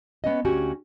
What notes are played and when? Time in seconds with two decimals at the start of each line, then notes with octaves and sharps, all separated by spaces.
0.24 B3 C#4 D#5
0.45 D2 C#4 F#4 G4 G#5